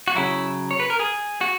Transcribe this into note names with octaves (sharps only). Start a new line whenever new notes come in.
F#4
C#3 F#3 E4
C#5
B4
A#4
G#4
F#4